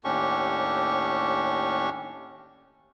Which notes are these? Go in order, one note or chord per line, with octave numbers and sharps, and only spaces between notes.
D#2 A2 C#4 D4 G4 C#6